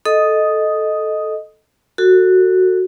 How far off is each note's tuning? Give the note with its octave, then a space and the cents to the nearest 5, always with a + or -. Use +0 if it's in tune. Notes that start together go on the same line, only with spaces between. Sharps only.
A4 -10 D#5 +0 D#6 +0
F#4 +0 A4 +30